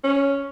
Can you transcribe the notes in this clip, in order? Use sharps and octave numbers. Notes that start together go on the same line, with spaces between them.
C#4